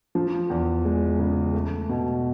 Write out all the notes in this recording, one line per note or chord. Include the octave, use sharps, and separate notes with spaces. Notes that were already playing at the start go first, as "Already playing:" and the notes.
F3
E2
G#3
C#3
A3
B2